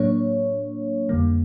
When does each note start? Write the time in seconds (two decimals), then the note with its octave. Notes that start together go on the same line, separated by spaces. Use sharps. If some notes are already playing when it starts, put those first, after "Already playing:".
Already playing: A2 F#3 A#3 D4 C#5
1.09 F2 D3 G3 A#3